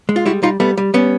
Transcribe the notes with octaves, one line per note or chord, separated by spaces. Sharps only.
G#3
F4
G3 E4 F#4
G3 D#4 F4
G3 A3 B3
G3
G3 B3 C#4